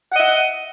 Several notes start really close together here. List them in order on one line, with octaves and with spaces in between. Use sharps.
F#5 D#5 E5